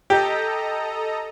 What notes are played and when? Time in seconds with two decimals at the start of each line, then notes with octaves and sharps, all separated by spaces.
0.10 G4 A4 D#5 A#5